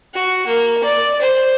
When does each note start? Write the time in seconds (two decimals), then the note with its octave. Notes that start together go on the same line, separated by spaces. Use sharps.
0.14 F#4
0.47 A#3
0.84 D5
1.21 C5